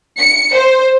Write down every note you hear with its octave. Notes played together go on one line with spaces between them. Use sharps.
C#7
C5